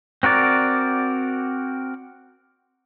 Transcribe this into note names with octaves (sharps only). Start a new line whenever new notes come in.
C4 F#4 A#4 D5